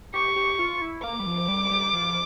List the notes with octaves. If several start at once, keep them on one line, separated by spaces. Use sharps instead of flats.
G4 C#6
G4
F4
E4
A#3 D6
G3
F3
G3
G3
F3